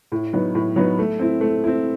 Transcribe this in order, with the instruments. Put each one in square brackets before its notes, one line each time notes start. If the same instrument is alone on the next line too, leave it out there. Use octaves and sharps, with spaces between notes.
[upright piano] A2
F#3 B3 D#4
A2
F#3 B3 D#4
A3
C4 E4
A3
C4 E4